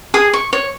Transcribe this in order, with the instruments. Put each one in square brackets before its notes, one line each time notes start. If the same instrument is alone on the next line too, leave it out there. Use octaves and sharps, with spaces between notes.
[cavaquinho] G#4 D#6
C#6
C#5